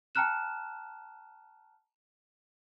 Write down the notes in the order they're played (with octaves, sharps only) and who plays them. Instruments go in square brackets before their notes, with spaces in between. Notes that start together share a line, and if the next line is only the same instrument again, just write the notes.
[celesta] G5 A5 A#5 F6 F#6 E7